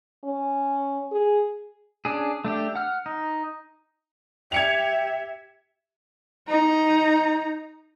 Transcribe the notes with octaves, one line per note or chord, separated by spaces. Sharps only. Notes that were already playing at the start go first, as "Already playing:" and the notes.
C#4
G#4
C#4 D4 G#4
A3 D4 G4
F#5 F6
D#4
G4 E5 G5 G#6 C#7 F7
D#4 A#5